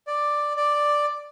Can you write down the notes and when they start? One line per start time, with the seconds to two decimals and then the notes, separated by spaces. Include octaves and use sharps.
0.07 D5
0.56 D5